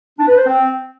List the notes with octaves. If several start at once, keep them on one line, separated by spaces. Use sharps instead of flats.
D4
B4
C5
C4